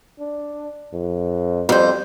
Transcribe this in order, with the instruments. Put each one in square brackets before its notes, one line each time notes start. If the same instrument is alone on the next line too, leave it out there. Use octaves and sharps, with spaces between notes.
[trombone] D4
F2
[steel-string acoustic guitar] F2 C5 [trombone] G3